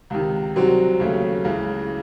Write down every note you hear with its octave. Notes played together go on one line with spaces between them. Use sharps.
C#2 C3 D#3
C2 C3 F#3 C4 F#4
D#2 C#3 F#3 A3 C#4
C#2 C#3 E3